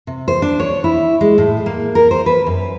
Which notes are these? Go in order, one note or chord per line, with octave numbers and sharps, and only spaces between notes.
C3
C5
D4
C#5
E4
G#3
A2
A#3
A#4
C5
B4
F#2